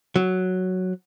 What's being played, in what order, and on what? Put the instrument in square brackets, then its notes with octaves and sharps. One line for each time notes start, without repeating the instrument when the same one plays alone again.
[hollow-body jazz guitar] F#3